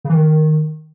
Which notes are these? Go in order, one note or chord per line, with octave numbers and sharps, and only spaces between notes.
C#3
E3
D#3